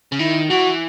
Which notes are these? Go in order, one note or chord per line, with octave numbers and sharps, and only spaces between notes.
C#3
D#3 E4
E3 F#4